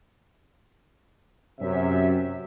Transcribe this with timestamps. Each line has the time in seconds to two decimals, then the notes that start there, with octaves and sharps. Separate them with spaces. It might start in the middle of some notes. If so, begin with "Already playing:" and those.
1.60 F#2 C3 E5